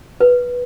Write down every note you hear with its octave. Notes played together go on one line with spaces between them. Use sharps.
B4